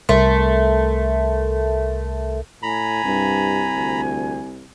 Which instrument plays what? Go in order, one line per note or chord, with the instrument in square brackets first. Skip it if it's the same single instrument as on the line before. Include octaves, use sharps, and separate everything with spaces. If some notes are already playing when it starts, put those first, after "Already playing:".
[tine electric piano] C2 A#4 C6 [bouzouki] A3
[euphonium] A2 [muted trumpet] G#5 [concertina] A#5 B5
[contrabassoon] C2 [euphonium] G2
[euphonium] D2